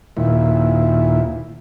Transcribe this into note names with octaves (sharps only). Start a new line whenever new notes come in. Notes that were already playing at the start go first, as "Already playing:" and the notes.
D#2 A#2 E4